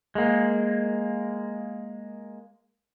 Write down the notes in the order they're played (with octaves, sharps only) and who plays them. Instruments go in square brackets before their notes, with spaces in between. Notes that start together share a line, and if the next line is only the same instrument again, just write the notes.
[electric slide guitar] G#3 A#3